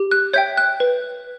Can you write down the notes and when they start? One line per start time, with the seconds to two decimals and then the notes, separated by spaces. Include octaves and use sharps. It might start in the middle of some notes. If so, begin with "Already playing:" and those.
Already playing: G4
0.11 F#6
0.33 C#5 E5 G5 G6
0.57 F#6
0.80 B4